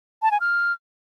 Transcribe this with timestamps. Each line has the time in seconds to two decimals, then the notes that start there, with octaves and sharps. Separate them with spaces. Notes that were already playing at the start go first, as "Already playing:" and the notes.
0.22 A5
0.31 G#5
0.40 F6